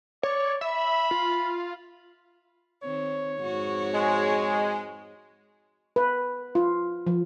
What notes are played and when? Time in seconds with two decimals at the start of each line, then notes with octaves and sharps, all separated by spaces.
0.23 C#5 D5
0.61 E5 B5
1.11 F4
2.84 D#3 C4 C#5
3.40 F2 G#2 F#4
3.93 G#3
5.96 B4
6.55 F4
7.07 F3